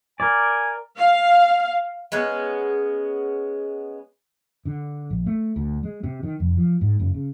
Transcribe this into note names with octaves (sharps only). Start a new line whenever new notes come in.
A#4 D5 G#5
F5
G#3 B3 C#4
D3
A#1
A3
D2
G#3
C3
D#3
F1
F3
G#2
F#1
C#3